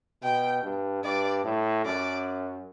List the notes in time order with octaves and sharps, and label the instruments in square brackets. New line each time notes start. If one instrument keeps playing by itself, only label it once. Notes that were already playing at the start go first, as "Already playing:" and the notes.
[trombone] B2 [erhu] G5
[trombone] G2
[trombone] G2 [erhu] D5
[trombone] A2
[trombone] F#2 [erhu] D5